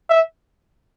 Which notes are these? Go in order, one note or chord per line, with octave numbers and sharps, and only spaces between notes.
E5